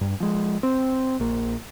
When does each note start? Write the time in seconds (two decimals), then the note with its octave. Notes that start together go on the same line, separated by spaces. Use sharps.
0.01 G2
0.20 F3 G#3
0.63 C4
1.20 A#1 A#3